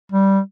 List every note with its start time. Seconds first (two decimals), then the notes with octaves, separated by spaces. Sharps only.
0.12 G3